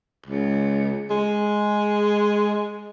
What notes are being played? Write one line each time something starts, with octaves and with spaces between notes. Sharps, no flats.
C#2
G#3